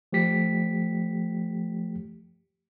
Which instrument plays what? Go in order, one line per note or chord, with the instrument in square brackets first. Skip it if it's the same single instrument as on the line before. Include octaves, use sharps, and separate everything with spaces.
[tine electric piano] F3 A3 G4 B6